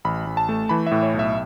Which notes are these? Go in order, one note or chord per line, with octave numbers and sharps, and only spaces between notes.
A1 B5
A1
A5
A3
E3 B5
A2 E5
C#5
B1
E5